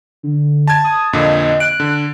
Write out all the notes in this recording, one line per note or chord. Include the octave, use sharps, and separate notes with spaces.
D3
A5 G#6
D#6
F2 A#2 D3 D#5
F#6 D7
D3